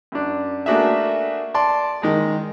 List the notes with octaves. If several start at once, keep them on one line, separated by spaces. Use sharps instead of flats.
F#2 D4
A3 A#3 D4 F#4 G#4 E5
D5 A5 C6
D#3 G#3 G#4